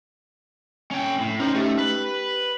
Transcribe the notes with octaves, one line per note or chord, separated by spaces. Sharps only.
C#4 G5
A2
C#4 D#4 A#4 C5
A3 G4
B4